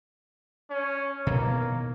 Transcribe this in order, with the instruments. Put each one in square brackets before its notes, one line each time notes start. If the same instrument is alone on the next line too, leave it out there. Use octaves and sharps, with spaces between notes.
[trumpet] C#4
[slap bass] B2 D#3 E3 [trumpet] A#3